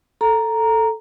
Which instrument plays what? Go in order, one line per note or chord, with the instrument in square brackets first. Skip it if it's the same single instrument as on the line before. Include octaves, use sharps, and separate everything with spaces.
[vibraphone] A4 A#5